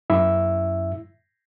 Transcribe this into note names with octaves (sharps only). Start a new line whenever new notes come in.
F#2 E4 E5 E6